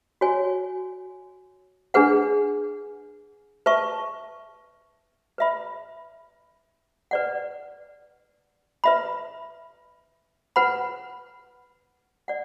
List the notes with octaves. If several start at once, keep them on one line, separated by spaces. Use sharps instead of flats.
F#4 C#5 G#5
D4 G#4 B4 F#5
B4 E5 A5 C#6
B4 E5 B5
B4 D5 F#5
B4 E5 B5
B4 F#5 B5
D5 F#5